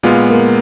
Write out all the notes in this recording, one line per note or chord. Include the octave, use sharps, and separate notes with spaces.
A#2 G#3 B3 F4
A#3